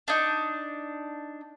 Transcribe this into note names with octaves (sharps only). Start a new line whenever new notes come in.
D4 D#4